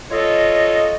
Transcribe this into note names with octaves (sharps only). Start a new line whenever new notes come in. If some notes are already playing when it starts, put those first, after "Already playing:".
F4 A4 C#5 D#5